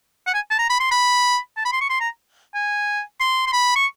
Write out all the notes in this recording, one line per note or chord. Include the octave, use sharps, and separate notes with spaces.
F#5
G#5
A5
A#5
B5
C6
B5
A5
B5
C6
C#6
C6
A#5
G#5
C6
C6
B5
C#6